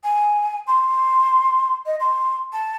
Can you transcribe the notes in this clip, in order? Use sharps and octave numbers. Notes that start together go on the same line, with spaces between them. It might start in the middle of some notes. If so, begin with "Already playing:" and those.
G#5
C6
D#5
C6
A5